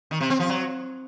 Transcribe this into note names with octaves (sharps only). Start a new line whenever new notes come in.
D#3
C3
C4
F3
F#3